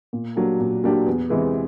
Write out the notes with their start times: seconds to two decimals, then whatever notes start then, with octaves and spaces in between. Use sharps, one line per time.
0.13 A#2
0.36 F#3 A#3 D4 G4
0.60 A#2
0.84 F#3 A#3 D4 G4
1.06 E2
1.30 C3 E3 G#3